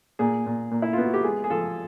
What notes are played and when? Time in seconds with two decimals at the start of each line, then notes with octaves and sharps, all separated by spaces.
0.19 A#2 G#4
0.46 A#2
0.71 A#2
0.82 E4
0.93 B3 F4
1.03 F#4
1.14 G4
1.23 G#3 G#4
1.44 G#4
1.50 F3 A4